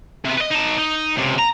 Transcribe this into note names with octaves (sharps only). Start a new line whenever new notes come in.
C3 B3
B4 D#5
D#4 A5
D#4
C#2 C3
A#5